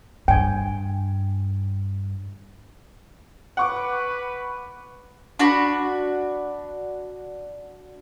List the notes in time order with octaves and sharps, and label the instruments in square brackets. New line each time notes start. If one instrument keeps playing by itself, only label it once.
[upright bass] G2 [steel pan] G5 G#5
[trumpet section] B4 [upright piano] F#5 C#6 D6
[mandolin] D4 F#4 B5